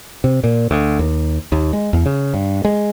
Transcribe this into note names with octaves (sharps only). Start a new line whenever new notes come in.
C3
A#2
D2
D#2
D#2
G#3
E2
C#3
G2
G#3